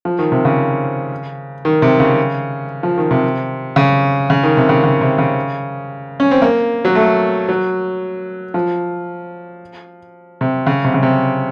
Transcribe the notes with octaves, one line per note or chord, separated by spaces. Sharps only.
F3
D#3
C3
C#3
D#3
C3
C#3
F3
D#3
C3
C#3
C#3
D#3
C3
C#3
C#3
C3
C#3
C#4
C4
A#3
F#3
A3
F#3
F3
C3
C#3
C3
C#3
C3